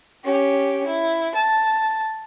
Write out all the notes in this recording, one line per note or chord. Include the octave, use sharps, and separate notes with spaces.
C#4 G4
E4
A5